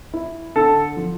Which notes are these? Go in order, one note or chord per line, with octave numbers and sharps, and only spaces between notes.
E4
D3 A4
F3